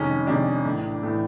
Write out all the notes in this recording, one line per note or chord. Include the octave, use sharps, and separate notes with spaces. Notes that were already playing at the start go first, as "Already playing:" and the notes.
Already playing: F2 C3 D#3 G#3 C#4
F2 C3 D#3 G#3 D4
A#1 A2 E3 A3
A2 E3 A3